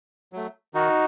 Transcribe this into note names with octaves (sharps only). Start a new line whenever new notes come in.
F#3 A3
D#3 D#4 F#4